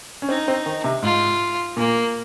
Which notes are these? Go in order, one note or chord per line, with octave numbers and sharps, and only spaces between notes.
C#4
C4 D#4
C4
D#3
C3
G#2 F4
A#2 A#3